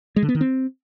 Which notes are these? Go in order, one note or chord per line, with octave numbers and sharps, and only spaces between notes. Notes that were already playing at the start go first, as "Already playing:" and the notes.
G#3
D3
B3
D#3
C4